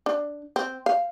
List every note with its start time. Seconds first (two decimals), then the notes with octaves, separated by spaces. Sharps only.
0.06 D4
0.56 C4
0.86 F5